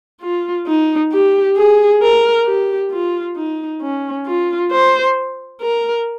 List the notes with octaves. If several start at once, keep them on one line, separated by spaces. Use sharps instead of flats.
F4
D#4
G4
G#4
A#4
G4
F4
D#4
C#4
F4
C5
A#4